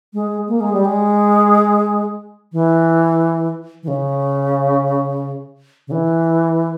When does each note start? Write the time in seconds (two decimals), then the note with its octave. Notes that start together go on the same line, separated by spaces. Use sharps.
0.14 G#3
0.48 A#3
0.60 G#3
0.73 G3
0.85 G#3
2.52 E3
3.83 E3
3.88 C#3
5.88 C#3
5.92 E3